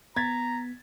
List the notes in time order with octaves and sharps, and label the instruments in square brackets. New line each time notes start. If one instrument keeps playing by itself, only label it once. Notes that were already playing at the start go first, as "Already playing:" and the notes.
[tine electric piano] B3 B6 [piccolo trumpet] A#5 [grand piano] G#6 A6